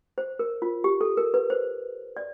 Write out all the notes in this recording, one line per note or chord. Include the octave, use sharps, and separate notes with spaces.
C5
A#4
F4
G4
A4
A#4
B4
C5
D5